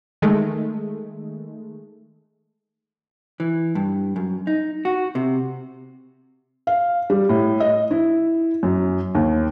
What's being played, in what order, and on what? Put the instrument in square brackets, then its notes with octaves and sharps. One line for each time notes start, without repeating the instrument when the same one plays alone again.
[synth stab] D#3 G#3 A3
[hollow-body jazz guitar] E3
G2
F#2
D#4
F#4
C3
[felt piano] F5
G3
A2
D#5
E4
F#2
D#2